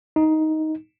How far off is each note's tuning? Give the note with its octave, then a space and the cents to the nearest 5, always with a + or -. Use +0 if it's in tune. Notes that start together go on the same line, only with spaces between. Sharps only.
D#4 +10